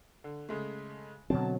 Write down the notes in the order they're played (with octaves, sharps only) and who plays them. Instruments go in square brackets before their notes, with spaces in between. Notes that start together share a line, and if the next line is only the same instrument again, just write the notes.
[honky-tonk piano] D3
C#3 G#3 A3
[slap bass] B2 D3 C4 [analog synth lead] F#3 [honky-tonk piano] A5